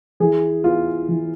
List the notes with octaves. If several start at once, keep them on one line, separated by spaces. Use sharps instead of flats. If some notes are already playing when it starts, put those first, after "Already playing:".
E3 G#4
B3 F4
E3